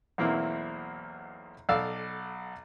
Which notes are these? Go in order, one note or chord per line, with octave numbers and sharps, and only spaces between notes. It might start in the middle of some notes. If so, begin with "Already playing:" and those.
B1 E2 A#3 C4 E4
B1 A4 D5 F5 E6